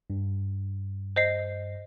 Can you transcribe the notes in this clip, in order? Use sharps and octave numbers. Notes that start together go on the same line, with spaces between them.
G2
C5 D#5 C7